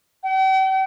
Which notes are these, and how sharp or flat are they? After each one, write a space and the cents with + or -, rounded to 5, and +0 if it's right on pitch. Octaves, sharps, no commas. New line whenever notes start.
G5 -45